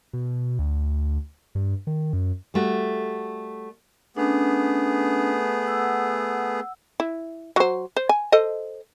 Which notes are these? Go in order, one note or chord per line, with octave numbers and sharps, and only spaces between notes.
B2
D2
G2
D#3
F#2
G3 A3 F#4
A3 B3 C#4 D4 G#4
F#5 E6
E4
F#3 C5
C5
G#5
A4 C5 D#5